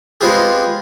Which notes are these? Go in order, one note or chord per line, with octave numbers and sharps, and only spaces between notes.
G#3 B3 C4 F4 G4 G#4